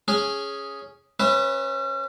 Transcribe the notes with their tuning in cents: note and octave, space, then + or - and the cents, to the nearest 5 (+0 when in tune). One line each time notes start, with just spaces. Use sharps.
C#4 +0 G#4 +0
C#4 -30 B4 +0 E5 -15